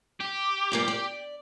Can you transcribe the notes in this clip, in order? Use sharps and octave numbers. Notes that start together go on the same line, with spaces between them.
G4
G2 A#2 A#3
D5